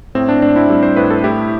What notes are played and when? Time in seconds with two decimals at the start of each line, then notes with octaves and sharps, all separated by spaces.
0.15 A2 C4
0.29 D4
0.42 A2 D4
0.56 C4 E4
0.70 G3
0.83 C5
0.96 A2 B4
1.10 A4
1.24 A3 E4 G4